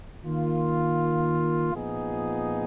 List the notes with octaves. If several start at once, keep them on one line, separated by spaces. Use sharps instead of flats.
D#3 A#3 F4
A#2 F3 B3 D#4 G#4